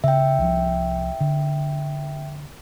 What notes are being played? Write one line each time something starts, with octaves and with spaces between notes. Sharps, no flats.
C#3 E5 G5
C2 F3
D3